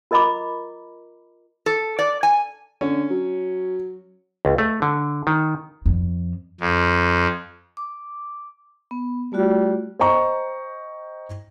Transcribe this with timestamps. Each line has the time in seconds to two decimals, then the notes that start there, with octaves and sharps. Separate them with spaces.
0.11 F4 A#4 D#5 A#5 B5 D6
1.66 A4
1.99 D5
2.23 G#5
2.81 D3 C#4
3.10 F#3
4.45 C#2
4.58 A3
4.82 D3
5.27 D#3
5.86 F2
6.60 F2
7.77 D6
8.91 B3
9.33 G3 A3 F4 F#4
9.99 C5 D#5 G5 A#5 C#6